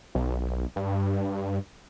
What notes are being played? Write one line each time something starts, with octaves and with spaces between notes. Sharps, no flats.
B1
G2